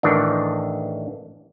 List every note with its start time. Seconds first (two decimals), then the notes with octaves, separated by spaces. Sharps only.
0.03 A1 D#3 E3 D4